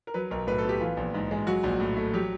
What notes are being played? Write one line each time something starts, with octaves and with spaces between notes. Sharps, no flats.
A#4
F#3 B4
B1 A#4
A2 B4
A4
B3 G4
E3 F4
A#1
G#2
G#3
F#3 F#4
A#1
A2
A3
F#3 G4